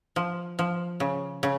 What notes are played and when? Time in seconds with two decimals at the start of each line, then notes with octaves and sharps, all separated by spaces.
0.16 F3
0.59 F3
1.00 C#3
1.43 C#3